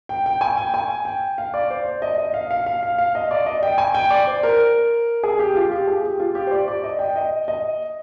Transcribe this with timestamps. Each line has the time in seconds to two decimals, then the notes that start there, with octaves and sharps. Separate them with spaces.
0.09 G5
0.26 G5
0.41 G#5
0.57 G5
0.74 G#5
1.05 G5
1.38 F5
1.54 D5
1.70 C5
1.85 D5
2.02 D#5
2.18 D#5
2.34 F5
2.51 F5
2.66 F5
2.83 F5
2.98 F5
3.15 D#5
3.31 D5
3.46 D#5
3.63 G5
3.78 G#5
3.94 G5
4.10 D5
4.27 C5
4.43 A#4
5.23 G#4
5.39 G4
5.55 F4
5.71 G4
5.87 G#4
6.03 G4
6.20 F4
6.35 G4
6.47 C5
6.51 D5
6.68 D5
6.84 D#5
6.99 G5
7.16 D#5
7.48 D#5